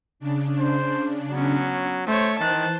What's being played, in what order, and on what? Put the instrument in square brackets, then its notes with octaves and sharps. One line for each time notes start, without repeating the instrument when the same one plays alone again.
[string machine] C#3 D4
[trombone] C5
[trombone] F#3 [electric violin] B3 C#4
[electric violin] A3 C#5 [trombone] C5
[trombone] D#3 [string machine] E3 C5 [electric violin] A5 F#6